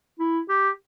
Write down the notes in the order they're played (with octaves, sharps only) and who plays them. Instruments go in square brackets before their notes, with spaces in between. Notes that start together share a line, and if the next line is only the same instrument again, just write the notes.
[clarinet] E4
G4